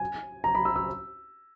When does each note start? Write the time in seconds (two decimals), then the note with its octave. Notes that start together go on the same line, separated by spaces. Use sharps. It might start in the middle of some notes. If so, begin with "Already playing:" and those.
Already playing: G#5
0.44 A#5
0.55 B5
0.65 E6
0.76 E6